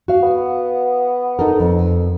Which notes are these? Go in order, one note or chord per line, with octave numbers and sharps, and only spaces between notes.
F#4 F5
B3
D#4 A4 A#4
F2